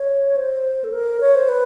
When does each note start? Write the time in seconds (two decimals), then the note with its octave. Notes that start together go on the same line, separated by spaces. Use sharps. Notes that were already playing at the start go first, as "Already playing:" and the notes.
Already playing: C#5
0.36 C5
0.84 A4
0.92 A#4
1.21 C#5
1.35 C5
1.49 B4